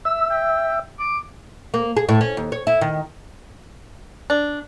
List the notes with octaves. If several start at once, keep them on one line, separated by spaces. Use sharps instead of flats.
E5 E6
G5
D6
A#3
G#4
A2
C#4
D#2
C#5
E4
D#3
D4